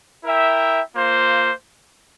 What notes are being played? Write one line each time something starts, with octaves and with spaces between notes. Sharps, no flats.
E4 A#4 E5 G5
A#3 F4 C5